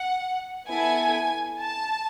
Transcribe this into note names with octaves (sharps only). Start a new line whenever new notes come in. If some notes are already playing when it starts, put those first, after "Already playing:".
Already playing: F#5
B3 E4 A4 G#5
A5